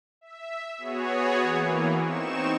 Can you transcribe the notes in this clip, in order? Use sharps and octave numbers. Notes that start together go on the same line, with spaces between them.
E5
B3 F#4 G#4 C#5
E3 A#3
C4 D#4 C#6 E7